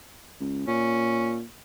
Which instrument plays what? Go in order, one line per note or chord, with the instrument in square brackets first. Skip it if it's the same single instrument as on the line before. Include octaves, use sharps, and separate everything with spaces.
[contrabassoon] C#2
[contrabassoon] A#2 [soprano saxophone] C#4